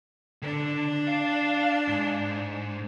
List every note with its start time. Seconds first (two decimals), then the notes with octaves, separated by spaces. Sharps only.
0.42 D3 D4
1.08 F5
1.88 G#2